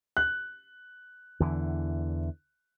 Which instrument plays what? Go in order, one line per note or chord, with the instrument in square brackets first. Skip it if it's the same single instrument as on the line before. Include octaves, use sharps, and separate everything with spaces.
[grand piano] F#6
[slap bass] E2 D3 E3